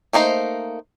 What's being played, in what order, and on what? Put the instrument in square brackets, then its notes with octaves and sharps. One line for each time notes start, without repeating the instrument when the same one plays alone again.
[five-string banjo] A3 A#3 D#4 C5